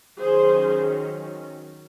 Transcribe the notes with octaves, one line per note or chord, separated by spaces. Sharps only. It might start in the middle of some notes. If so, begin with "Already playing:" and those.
D#3 F#3 C#4 G#4 C5